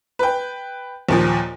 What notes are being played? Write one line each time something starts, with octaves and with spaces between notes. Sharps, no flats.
B4 G5
D#2 A#2 F3